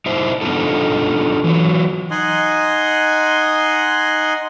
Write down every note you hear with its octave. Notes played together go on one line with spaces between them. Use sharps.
D#4 E4 C5
B3 D4 D#4 F4 A4
E3 F#3
D#4 D#5 F#5 G#5 C6